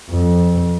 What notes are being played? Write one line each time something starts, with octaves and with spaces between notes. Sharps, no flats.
F2